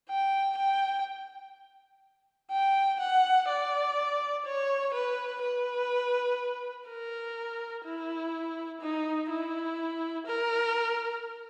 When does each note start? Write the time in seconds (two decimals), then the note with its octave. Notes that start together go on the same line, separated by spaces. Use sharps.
0.09 G5
0.57 G5
2.51 G5
3.01 F#5
3.49 D5
4.45 C#5
4.94 B4
5.42 B4
6.88 A#4
7.85 E4
8.81 D#4
9.30 E4
10.27 A#4